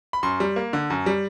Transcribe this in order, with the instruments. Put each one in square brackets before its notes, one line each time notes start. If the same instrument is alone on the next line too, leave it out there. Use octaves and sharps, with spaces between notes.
[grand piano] B5
F#2 C6
G3
A#3
D3
F#2
G3